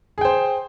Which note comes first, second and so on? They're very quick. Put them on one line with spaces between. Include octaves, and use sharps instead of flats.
G#4 G5 C5